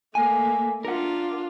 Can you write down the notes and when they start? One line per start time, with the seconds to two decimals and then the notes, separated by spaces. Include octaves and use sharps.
0.15 A3 A#3 G#5
0.85 D4 F4 A#4 F#5